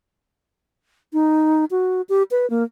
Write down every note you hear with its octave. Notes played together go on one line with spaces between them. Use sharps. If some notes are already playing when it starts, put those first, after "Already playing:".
D#4
F#4
G4
B4
A#3